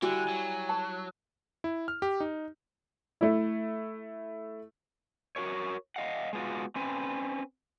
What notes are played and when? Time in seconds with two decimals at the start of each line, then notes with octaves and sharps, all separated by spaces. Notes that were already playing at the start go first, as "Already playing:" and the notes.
0.02 D3 G3 E4 F#4 G#5
0.28 F#3
0.69 A5
1.64 E4
1.88 F6
2.02 G4
2.20 D#4
3.21 A3 E4
5.36 F#4 A#4 C#5
5.96 D#5 F5 F#5
6.33 G#3 B3 F4 F#4
6.76 C4 C#4 B4